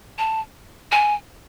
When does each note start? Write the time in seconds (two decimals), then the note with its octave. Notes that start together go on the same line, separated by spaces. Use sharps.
0.18 A5
0.92 G#5